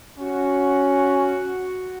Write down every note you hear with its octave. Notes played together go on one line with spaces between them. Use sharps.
C#4 F#4